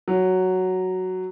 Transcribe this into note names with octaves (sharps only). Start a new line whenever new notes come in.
F#3